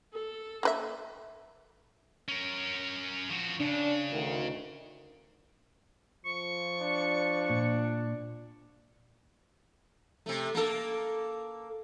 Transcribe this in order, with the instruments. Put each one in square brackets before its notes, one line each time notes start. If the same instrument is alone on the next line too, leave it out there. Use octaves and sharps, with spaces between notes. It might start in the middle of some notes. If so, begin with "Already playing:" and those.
[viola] A4
[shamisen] A#3 B4 E5
[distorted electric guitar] C#4 A#4
F3 F#4
[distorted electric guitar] C#3 [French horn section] D4
[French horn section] D2 D#3
[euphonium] F3 [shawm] C#6
[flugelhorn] D4
[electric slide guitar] A#2
[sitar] C3 A3
A#3 A4